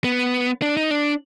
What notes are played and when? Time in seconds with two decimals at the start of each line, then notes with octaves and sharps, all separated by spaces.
0.04 B3
0.62 D4
0.77 D#4
0.91 D4